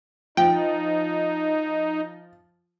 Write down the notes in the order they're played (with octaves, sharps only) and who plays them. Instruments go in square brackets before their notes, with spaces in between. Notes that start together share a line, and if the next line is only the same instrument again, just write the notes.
[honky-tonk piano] F3 [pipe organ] D#4 [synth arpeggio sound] G5